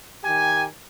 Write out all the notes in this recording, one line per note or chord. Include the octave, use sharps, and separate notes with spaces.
D#3 G4 G#5